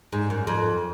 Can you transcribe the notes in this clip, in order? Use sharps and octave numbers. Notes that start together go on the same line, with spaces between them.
G#2
F#2
F2